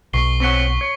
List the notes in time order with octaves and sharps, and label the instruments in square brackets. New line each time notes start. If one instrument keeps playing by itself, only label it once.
[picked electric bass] B1 [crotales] C#6 C7 G7
[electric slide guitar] C4 C#5 F#5 [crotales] C#6 B6 G7
[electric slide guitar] C#5